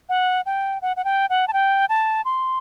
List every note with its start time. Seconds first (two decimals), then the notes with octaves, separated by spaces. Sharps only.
0.09 F#5
0.46 G5
0.82 F#5
0.97 F#5
1.05 G5
1.30 F#5
1.48 A5
1.53 G5
1.89 A5
2.25 C6